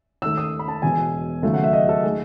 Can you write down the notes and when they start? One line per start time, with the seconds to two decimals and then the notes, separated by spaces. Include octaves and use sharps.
0.22 D#2 D#3 A3 E6
0.37 D#6
0.59 B5
0.68 A5
0.82 E1 E2 B2 G#5
1.42 D#2 C#3 F#3 A3
1.54 F#5
1.63 E5
1.73 D#5
1.89 A4
2.03 D#3 A3 G#4